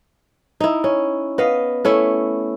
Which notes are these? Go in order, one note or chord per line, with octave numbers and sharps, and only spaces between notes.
D#4 E4
C#4
B3 D#5 F5
A3 C#4 E4